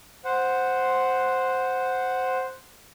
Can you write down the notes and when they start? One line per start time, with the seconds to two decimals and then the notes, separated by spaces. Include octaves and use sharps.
0.25 C5 F#5